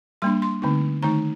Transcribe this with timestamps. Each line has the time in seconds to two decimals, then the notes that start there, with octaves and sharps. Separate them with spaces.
0.22 G3 A#3 D4 C6
0.42 C6
0.62 D3 A3 C4 D#4
1.03 D#3 A3 D#4 A#5